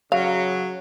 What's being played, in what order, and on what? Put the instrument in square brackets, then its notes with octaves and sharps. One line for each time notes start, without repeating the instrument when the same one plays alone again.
[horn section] C#3 F#3 [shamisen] F5